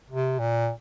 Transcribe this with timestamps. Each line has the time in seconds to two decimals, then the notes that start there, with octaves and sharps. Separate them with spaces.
0.10 C3
0.39 A#2